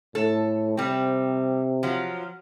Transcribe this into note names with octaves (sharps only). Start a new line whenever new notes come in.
A2 A4
C3 G3 C4
F3 F#3